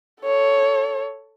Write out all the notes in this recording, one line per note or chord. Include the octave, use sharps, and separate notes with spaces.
A4 C#5